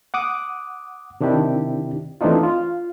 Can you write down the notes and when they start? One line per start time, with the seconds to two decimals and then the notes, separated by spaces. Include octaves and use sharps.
0.14 F#5 D6 D#6
1.21 C3 D#3 D4 E4 G4
2.21 E3 A3 C4 D4 D#4 F4
2.43 F4